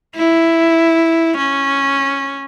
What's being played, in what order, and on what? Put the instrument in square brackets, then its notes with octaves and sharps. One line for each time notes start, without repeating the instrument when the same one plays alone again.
[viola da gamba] E4
C#4